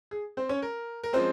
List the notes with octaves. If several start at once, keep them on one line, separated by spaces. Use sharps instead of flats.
G#4
C4 C5
C#4 C#5
A#4
A#4
F3 G#3 C4 C#4 C5